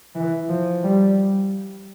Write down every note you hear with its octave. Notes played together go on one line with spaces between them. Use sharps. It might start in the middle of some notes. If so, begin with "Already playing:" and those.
E3
F3
G3